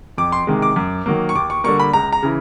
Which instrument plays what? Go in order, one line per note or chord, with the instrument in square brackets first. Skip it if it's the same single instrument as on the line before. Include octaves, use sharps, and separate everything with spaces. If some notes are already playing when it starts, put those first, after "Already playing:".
[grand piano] F2 D6
C6
C3 D#3 G#3
D6
F#2
D#3 F#3 A#3
C#6
D#2 D6
C#6
D3 G3 A#3 C#6
B5
C#2 A#5
A#5
C#3 E3